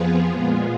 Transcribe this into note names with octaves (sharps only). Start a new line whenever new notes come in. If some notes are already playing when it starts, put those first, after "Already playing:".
Already playing: F2 F3 B3 F4 G#4
A#2 G#3 B3 F4 G#4